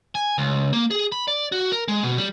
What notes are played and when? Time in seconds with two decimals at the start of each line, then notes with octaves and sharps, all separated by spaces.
0.15 G#5
0.38 C#2
0.73 A#3
0.91 G#4
1.12 B5
1.28 D5
1.52 F#4
1.72 A#4
1.88 G#3
2.03 B2
2.18 G3